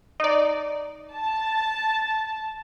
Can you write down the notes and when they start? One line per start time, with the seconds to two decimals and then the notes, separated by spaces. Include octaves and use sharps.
0.20 D#4 D5
1.13 A5